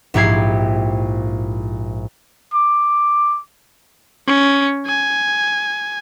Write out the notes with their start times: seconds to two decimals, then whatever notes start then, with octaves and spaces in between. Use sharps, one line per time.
0.14 A#1 G#2 E4 G4 G#6 C7
2.54 D6
4.27 C#4
4.86 G#5